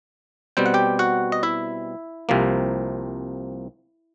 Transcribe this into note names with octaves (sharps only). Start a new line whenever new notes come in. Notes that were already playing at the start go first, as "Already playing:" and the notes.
B2 G3 C4 G5
F#5
G4 G5
F#4 F#5
D#5
E4 E5
C2 C3 F3 A#3